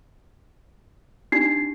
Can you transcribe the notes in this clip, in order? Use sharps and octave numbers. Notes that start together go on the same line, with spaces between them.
D4 D#4 G4 C7